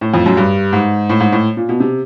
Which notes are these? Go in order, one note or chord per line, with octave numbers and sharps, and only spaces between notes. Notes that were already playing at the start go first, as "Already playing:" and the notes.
A2
F2
F#2
G2
G#2
A2
G#2
A2
A#2
B2
C3